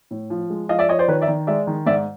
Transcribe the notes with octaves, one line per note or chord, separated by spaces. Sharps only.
A2
F3
G#3
F3 D#5 F5
D5 E5
F3 C#5 D#5
C5 D5
D#3 B4 C#5
D5 E5
D#3
G#3 D5 E5
D#3
G#2 D5 E5